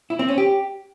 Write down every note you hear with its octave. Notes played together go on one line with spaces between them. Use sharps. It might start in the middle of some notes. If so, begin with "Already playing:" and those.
E4
C4
C#4
G4